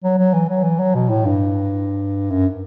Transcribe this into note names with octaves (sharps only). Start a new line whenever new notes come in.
F#3
F#3
E3
F#3
E3
F#3
B2
A2
G2
F#2